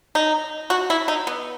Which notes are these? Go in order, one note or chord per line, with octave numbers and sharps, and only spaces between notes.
D#4
F#4
E4
D#4
B3